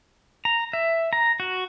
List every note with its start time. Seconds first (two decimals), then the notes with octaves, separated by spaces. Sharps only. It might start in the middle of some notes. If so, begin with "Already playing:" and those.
0.45 A#5
0.73 E5
1.13 A#5
1.40 F#4